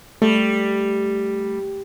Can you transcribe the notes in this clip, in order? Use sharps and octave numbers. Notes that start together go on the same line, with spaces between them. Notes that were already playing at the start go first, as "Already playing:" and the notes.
G3 A3